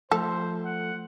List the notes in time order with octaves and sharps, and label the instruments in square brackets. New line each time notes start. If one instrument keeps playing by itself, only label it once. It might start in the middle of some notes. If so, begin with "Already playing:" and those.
[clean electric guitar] F3 A3 [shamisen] A4 [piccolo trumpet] C5
[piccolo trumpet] F#5